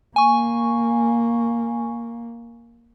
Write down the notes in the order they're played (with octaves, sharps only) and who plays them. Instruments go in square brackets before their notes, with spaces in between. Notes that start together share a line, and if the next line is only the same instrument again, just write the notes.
[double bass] A#3 [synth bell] G#5 C#6